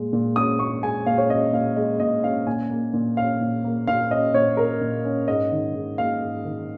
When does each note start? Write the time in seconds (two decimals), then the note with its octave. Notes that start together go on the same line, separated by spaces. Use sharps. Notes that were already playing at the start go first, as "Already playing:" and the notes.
Already playing: A#2 G#3
0.13 A#2
0.36 C#4 D#6
0.59 A#2 C#6
0.82 G#3 G#5
1.06 A#2 F5
1.18 C#5
1.29 C#4 D#5
1.53 A#2 F5
1.76 G#3 D#5
2.00 A#2 D#5
2.23 C#4 F5
2.47 A#2 G#5
2.71 A#3
2.93 A#2
3.17 C#4 F5
3.41 A#2
3.64 A#3
3.87 A#2 F5
4.10 C#4 D#5
4.34 A#2 C#5
4.57 A#3 A#4
4.81 A#2
5.05 C#4
5.28 G#2 D#5
5.52 D#3
5.75 G#2
5.98 A#3 F5
6.22 G#2
6.45 D#3